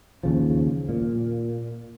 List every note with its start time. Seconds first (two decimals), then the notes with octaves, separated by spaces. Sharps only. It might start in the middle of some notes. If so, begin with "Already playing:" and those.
0.23 D#2 C#3 F3
0.89 A#2